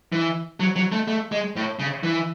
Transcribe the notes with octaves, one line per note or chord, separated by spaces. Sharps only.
E3
F#3
F#3
A3
A3
G#3
A2
C#3
E3